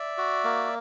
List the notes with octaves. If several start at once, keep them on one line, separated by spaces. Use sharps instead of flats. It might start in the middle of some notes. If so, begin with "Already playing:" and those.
Already playing: D5 E5
F#4
A#3